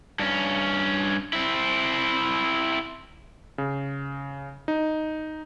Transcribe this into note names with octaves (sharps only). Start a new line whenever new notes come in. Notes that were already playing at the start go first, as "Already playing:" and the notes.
G2 C#4
C4 E4
C#3
D#4